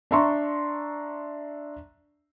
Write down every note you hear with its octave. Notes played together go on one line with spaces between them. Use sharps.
D4 E5 A#5 C6 C#6